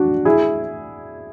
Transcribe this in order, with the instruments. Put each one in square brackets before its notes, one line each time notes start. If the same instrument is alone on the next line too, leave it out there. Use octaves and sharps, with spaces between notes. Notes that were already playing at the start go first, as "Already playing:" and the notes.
Already playing: [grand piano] D4 F#4
E4 G#4